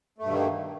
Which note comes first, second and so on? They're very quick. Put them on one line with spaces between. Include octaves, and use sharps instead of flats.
A3 G2 B2 D#3 A#3